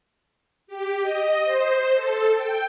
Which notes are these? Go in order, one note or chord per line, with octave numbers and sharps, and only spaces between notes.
G4
D#5
C5
A4
G5